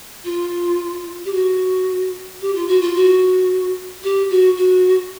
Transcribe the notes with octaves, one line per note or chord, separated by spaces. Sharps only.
F4
G4
F#4
G4
F4
F#4
F4
F#4
G4
F#4
F#4